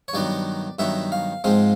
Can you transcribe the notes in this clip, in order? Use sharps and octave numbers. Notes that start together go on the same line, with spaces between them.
C#5
G2 D#3 F#3 B3 D5
G2 D#3 F#3 B3 E5
F5
G#2 F3 G#3 C4 F5